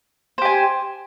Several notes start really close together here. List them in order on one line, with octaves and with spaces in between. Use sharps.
C5 G4 G#5